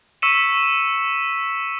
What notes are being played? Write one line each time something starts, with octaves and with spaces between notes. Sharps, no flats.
C#6 E6 B6 C#7 D#7 E7